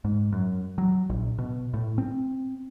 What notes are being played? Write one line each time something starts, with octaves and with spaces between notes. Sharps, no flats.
G#2
F#2
F#3
A#1
B2
A2
C4